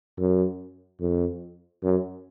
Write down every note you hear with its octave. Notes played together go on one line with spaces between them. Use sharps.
F#2
F2
F#2